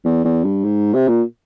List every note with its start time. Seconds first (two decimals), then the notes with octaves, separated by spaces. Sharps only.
0.05 E2
0.25 E2
0.44 G2
0.64 G#2
0.94 C3
1.08 A#2